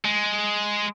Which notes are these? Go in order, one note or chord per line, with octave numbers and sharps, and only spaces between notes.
G#3